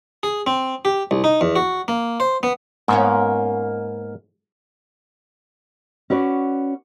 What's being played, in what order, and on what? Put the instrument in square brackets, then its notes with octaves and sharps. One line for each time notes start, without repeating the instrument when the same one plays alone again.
[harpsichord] G#4
C4
G4
C2
D#4
E2
F#4
A#3
C5
B3
[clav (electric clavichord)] G#2 [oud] A#3 B3 C#4
[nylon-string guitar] C#4 F#4 B4 D5